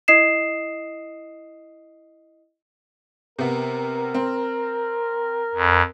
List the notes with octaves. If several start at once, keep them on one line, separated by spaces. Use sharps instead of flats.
E4 D#5 D#6 C7 E7
C3 B3 A#4
C4
F2